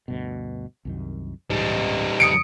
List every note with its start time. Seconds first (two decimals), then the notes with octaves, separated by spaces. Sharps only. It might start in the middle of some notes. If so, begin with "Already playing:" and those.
0.08 D2 G2 B2
0.85 C2 F#2 D#3
1.50 C#2 G#2 E3 G3 D#4
2.20 F2 C#3 D#6 C#7 D7